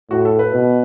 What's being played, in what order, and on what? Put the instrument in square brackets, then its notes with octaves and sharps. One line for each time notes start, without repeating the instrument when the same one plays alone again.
[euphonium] A2 [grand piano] F#4
[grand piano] A4
B4
[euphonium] B2